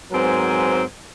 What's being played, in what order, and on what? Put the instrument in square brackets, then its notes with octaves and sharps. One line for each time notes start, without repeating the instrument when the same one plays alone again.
[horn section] G#2 F#3 B3 C4 A#4 G#5